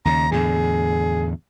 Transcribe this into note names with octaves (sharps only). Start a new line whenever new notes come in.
D#2 C#3 A#5
E2 A2 D3 G#4